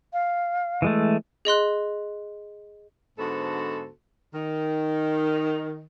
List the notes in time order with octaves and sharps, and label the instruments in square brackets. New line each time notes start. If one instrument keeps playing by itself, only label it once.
[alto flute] F5
[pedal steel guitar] E3 G#3 A3
[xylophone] G#4 D#5 C6 F#6
[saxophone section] G#2 D3 B3 F#4 A4 C5
D#3